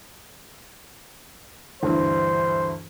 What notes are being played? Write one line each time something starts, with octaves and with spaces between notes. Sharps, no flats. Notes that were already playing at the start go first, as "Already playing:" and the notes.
D2 G2 E3 C5